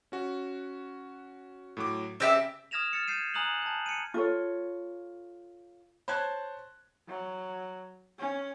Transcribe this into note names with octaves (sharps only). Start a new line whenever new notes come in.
C#4 F#4
A2 F#3 D6
C#3 C4 G4 E5
D#6 F6 G#6 A#6 E7 F7
F6 A6 C#7
G6 G#6 C7 D#7
G#5 A#5 D#6 F#6 F7 F#7
A5 G6
C#7 D#7
F4 A4 C#5
C5 C#5 A5 F#6 G#6
F#3
C#4